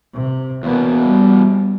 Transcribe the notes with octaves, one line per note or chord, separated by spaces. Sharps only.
C3
E2 B2 A#3 B3
G3